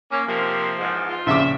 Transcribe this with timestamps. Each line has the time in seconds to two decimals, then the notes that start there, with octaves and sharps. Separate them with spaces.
0.11 A#3 C#4
0.27 C3 F3 A#3
0.80 E2 G#2
1.08 F4
1.26 A#1 C#3 E5 D6